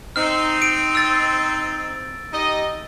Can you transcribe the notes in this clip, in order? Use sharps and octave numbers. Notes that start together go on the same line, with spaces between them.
C4 D#4 F6
D7
E6 A6
D#4 G4 D#5